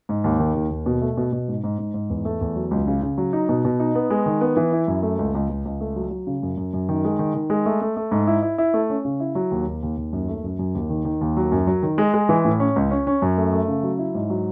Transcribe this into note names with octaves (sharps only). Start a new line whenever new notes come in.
G#2
D#2
D#3
D#2
D#2
B2
A3
B2
B2
G#2
G#2
G#2
G#2
E2
A3
E2
F#3
C#2
C#3
C#3
F#3
D#4
B2
B2
D#4
B3
G#3
D#3
B3
E3
E4
F#2
A3
C#2
C#2
C#2
C#2
A3
F#3
F#3
C#3
F#2
F#2
F#2
D#3
G#3
D#3
D#3
G#3
A3
A3
A3
G#2
E4
E4
E4
A3
C#4
C#3
E4
F#3
D#2
D#2
D#2
D#2
F#2
A3
F#2
F#2
D#2
D#3
D#3
D#2
F#3
F#2
F#3
D#3
G#3
G#3
E3
A2
C#4
C#2
C#4
C#4
F#2
A3
A3
C#3
F#3
E4
G#2
F#3